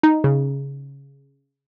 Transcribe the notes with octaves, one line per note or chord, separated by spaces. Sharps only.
D#4
C#3